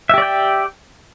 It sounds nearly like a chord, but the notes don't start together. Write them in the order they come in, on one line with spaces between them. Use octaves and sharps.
E5 G4 D5 G5